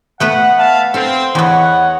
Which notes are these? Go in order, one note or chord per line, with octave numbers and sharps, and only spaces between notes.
A3 B3 B4 F#5
E5 F5 A5
C4 A4 F5
E2 B3 C#5 D#5 F#5